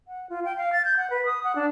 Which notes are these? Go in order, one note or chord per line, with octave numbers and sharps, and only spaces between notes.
F#5
F4
G5
F5
A6
G6
F#5
B4
D#6
F#5
D4